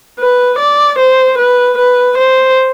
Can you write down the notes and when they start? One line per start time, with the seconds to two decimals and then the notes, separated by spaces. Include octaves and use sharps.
0.19 B4
0.59 D5
0.99 C5
1.38 B4
1.78 B4
2.18 C5